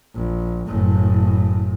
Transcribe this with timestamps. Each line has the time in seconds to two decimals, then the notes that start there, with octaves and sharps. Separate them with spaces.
0.14 A#1
0.66 F#1 A2